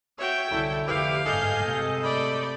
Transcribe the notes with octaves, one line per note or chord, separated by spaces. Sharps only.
F#4 C#5 E5 G5
C2 D3 F#3 C#4 E4 A4
F1 D3 E4 G4 B4 F5
G1 G#2 A4 D#5 G#5 G6
C3 G#3
A3 D5 B5 G6